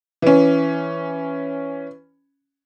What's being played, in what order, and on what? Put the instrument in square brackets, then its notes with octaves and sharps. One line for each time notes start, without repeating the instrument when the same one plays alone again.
[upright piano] E3 C#4